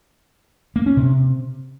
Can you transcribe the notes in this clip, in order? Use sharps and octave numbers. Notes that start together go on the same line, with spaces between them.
A#3
C#4
C3